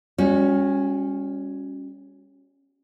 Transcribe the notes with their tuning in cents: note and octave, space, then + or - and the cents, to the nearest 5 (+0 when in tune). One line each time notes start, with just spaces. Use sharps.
G3 +35 C#4 +0 F#4 -20